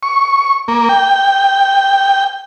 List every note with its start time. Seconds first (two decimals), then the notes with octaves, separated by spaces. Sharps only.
0.03 C#6
0.68 A#3
0.89 G5